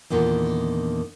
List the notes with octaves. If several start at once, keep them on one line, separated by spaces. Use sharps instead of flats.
E2 A#2 D3 D#3